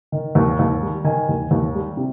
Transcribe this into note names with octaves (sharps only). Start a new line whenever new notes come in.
D#3
D#2
D#2
G3
D#3 G#5
D#2
D#2
G3
C3